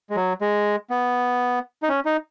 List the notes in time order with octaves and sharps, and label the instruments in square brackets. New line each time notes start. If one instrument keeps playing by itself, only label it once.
[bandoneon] G#3
F#3
G#3
B3
D#4
C#4
D#4